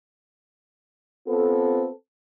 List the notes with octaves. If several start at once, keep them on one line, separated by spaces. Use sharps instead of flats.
B3 C4 F4 A4